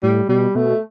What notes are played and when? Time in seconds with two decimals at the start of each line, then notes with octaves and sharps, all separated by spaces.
0.03 A2 G3
0.29 B2 G3
0.55 B2 A3